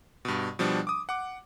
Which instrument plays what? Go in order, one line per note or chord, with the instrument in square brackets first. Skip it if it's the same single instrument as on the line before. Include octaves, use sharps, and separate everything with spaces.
[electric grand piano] G2 B2
B2 F3 G3 D4
D6 D#6
F#5 D6